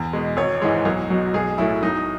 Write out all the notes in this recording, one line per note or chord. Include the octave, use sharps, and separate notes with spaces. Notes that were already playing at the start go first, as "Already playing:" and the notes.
Already playing: E2
B2 G#3
G#1 C#5
G#2 E3 G#3
B1
B2 F#3
B1 G#4
A2 F#3 E4
B1 D#4